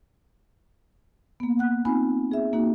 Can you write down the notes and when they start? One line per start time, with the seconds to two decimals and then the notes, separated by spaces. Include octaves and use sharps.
1.40 A#3 B3
1.59 F#5 F#6
1.85 C4 D#4 F4 G#5 B5
2.31 G#4 E5
2.53 A#3 D#4 F#4